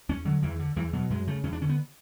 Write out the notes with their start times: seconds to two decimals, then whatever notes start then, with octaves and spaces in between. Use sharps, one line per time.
0.09 E2 C#4
0.25 D3 F#3
0.43 E2 E3
0.59 D3
0.76 E2 E3
0.93 B2 F#3
1.10 F#2 G#3
1.27 C#3 A3
1.43 E2 C#4
1.53 D4
1.61 D3 C#4
1.69 B3